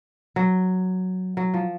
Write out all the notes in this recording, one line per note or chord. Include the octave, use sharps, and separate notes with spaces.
F#3
F#3
F3